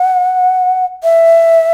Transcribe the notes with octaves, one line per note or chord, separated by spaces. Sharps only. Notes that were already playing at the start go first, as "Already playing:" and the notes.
Already playing: F#5
E5